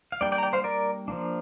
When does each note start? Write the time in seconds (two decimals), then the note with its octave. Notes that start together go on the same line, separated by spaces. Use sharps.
0.12 F5
0.21 G3 A#3 D4 D5 G5
0.32 D5 G5
0.38 A#5
0.43 D5 G5
0.53 C5 F5
0.64 A#4 D5
1.08 F3 A#3 D4